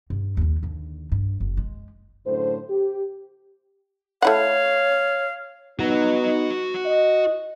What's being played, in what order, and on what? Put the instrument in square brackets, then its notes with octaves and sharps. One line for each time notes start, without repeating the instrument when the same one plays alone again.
[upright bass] G2
D#2 G3
D#2 D3
G2
F#1
G#3
[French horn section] F#2 A2 D3 C5
G4
[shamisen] A3 E4 F#5 [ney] C#5 [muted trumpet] F5
[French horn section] B3 D#4 [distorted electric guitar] F#4 A#5
[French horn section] D#5